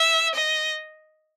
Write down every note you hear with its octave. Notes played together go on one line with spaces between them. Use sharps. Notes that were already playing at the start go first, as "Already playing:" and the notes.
Already playing: E5
D#5